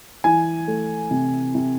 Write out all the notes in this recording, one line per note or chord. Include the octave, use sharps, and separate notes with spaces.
E3 G#5
A3
C3
C3